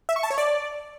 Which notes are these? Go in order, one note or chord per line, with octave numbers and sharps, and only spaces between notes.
E5
C#6
A5
C#5
D5